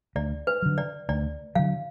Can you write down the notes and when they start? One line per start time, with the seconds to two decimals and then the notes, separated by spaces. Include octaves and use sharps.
0.15 D2 D5
0.47 B4
0.62 D3 F#3
0.78 D5
1.09 D2 D5
1.55 D3 F#3 F5